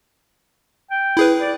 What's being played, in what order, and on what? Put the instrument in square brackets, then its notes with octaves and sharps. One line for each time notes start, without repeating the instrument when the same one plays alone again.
[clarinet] G5
[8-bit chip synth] E4 G#4 B4
[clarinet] D5